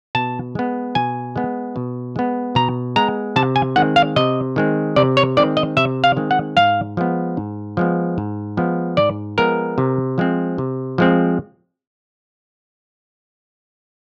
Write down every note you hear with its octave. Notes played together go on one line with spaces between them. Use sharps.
B2 A5
G#3 B3
B2 G#5
G#3 B3
B2
G#3 B3
B2 A#5
G#3 B3 A#5
C3 A5
G#5
D#3 G#3 C4 F#5
F5
C3 D#5
D#3 G#3 C4
C3 D5
C#5
D#3 G#3 C4 D5
D#5
C3 E5
F5
D#3 G#3 C4
F#5
G#2 F5
F3 G#3 B3
G#2
F3 G#3 B3
G#2
F3 G#3 B3
G#2 D5
F3 G#3 B3 A#4
C3
F3 G#3 C4
C3
F3 G#3 C4